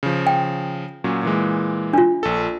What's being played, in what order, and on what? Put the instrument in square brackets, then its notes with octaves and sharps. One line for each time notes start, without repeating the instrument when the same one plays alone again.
[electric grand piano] C#3 F3
[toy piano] G5
[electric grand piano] A#2 F#3 C#4
A#2 E3 G#3
[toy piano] D4 F4
[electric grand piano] A#1 A4